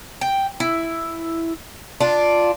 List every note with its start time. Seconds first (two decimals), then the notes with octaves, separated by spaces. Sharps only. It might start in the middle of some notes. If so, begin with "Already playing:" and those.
0.21 G5
0.60 E4
2.00 D4 F4